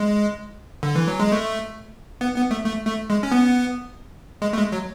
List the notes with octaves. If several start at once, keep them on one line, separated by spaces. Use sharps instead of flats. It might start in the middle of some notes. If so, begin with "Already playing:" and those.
Already playing: G#3
D3
E3
F#3
G#3
A3
B3
B3
A3
A3
A3
G#3
C#4
B3
G#3
A3
G#3
F#3